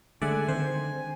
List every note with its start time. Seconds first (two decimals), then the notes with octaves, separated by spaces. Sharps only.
0.22 D3 G#3 A3 D5 E5 F#5 G#5
0.48 D3 D#3 C4 C5